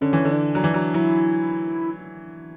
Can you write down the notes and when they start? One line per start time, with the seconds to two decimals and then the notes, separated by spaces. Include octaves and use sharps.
0.01 D3 C#4
0.13 E3
0.25 D3
0.32 D4
0.55 F#3
0.64 E3
0.74 F#3
0.94 F#3 E4